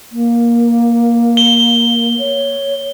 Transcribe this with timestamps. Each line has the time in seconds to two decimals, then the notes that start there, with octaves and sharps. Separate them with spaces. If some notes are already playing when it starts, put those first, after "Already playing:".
0.12 A#3
1.37 G7
2.18 C#5